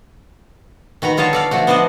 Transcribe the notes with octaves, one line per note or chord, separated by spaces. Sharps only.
D#3 F#4 B4 A#5
D3 F4 C#5 D#5 F5 A5
A4 D5 F5
D3 F3 A3 F#4
B3 D4 C5 D5 D#5 F#5